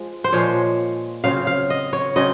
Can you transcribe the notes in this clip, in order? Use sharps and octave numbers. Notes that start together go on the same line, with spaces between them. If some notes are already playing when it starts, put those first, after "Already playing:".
Already playing: F3 G#3
C5
A#2 F3 G#3 C#5
C#3 F#3 C4 F5
F5
D#5
C#5
C#3 F#3 C4 D#5